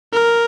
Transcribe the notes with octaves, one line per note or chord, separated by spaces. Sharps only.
A#4